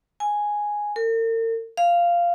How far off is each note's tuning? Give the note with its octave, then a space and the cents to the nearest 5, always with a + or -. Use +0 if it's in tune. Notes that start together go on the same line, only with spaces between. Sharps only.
G#5 +0
A#4 -45
F5 -10